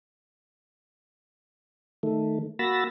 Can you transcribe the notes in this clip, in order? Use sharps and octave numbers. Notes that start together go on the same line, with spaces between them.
D#3 A3
A#3 F#4 B5 E6 A6 A#6